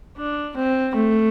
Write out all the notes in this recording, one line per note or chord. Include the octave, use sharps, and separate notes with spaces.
D4
C4
A3